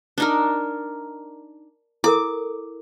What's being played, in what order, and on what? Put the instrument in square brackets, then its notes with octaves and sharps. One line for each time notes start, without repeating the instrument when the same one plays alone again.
[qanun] D4 D#4 A#4
[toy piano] E4 A4 A#4 [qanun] D6